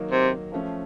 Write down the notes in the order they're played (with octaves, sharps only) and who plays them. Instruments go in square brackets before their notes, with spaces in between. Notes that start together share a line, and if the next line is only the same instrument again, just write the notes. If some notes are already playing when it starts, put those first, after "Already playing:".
Already playing: [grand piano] D#3 F#3 A#3 D#4
[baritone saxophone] C3
[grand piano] F3 A3 C#4